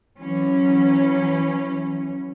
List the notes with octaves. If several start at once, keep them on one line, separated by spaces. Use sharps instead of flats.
E3 F#3 C#4